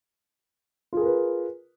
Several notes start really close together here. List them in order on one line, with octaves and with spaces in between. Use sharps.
F4 G#4 A#4 B4